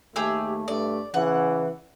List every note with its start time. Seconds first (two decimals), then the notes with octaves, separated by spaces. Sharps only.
0.16 D#2 A3 G4 G#4 E6
0.68 G2 A3 D5
1.14 C#3 E3 F#5